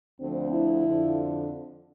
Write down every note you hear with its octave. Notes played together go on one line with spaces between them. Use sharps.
D2 D3 F3 C4
E4
F2 D3 F3